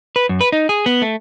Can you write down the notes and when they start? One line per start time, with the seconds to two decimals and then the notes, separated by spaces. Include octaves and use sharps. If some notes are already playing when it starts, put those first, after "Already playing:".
0.16 B4
0.29 F#2
0.41 B4
0.52 D#4
0.69 G#4
0.86 B3
1.02 A3